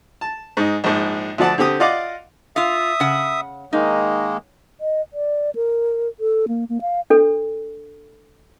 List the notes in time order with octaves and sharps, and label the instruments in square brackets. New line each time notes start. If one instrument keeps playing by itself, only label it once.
[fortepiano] A5
G#2 D#4
A#1 G#2
D2 F3 D5 F#5 A5
D3 C4 G4 D#6
F4 D5 D#5 F5 F#5 D6
[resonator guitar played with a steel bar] F4 F5 [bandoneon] E5 D#6
[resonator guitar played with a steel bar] C#3 F#5
[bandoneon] D#3 G#3 A#3 [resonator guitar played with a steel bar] D#4
[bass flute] D#5
D5
A#4
A4
A#3
A#3
F5
[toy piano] D4 A4